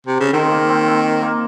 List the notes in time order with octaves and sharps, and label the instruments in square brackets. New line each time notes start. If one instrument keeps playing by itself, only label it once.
[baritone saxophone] C3
C#3
[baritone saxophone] D#3 [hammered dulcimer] C4 D#4
[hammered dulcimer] A#3
C4
C4
A#3